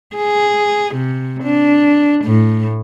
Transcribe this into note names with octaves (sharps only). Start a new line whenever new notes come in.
G#4
C3
D4
A2